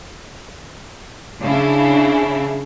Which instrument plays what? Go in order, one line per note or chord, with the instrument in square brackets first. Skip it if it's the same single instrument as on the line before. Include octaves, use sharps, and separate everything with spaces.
[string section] C#3 D4 E4